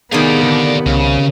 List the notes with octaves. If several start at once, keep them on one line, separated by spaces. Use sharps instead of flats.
C3 D#3 B3 G#4 D5 F5
D3
C2 C#3